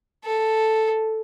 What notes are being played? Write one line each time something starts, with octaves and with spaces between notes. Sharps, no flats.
A4